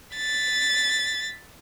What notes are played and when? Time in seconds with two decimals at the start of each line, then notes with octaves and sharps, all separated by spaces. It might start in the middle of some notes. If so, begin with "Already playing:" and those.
0.16 A6 B6